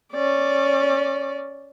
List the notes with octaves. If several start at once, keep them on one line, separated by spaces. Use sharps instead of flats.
C#4 D5